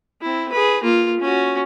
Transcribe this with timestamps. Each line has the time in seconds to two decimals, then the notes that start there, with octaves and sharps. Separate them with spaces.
0.22 C4 E4
0.52 G#4 B4
0.83 A#3 F4
1.20 C#4 F#4